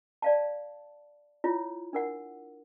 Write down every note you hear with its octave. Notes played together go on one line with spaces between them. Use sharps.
D5 F5 A5
E4 F4 C#5
D4 A#4 F#5